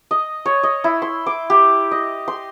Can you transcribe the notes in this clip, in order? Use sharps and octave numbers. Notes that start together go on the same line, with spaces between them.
D#5
C#5
D#5
E4
C6
D6
G4
D#5
C6